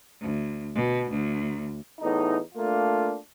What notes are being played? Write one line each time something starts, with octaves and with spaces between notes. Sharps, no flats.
D2
B2
D2
E2 A2 D#4
A3 A#3 D4 F4